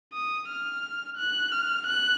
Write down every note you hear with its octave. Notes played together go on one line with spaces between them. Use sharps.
D#6
F6
F#6
F6
F#6